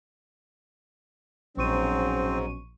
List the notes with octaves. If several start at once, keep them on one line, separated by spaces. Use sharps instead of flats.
A#1 G#2 B2 F#3 C4 C#4 C#6 D#7